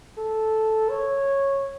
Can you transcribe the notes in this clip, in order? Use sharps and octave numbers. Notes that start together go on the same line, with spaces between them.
A4
C#5